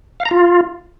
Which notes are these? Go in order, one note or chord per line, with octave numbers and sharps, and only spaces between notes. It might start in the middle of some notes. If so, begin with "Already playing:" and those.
F5
A#5
F4